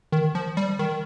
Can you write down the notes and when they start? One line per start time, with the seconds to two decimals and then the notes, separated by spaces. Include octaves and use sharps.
0.12 D#3
0.35 F3
0.57 G3
0.79 D#3